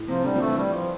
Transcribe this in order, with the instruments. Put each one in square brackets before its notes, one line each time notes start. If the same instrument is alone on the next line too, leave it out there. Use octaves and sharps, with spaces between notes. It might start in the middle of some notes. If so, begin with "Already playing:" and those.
Already playing: [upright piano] A2
[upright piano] C3 [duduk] F3
[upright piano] D3 [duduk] G3
[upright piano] F3
[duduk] A3
[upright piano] E3
[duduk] G3
F3